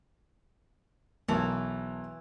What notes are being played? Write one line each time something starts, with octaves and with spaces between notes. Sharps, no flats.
B1 E3 A#4 A5